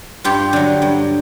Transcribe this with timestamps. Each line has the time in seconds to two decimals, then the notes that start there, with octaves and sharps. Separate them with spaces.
0.24 G2 F4 G4
0.53 D3 F#3
0.82 G2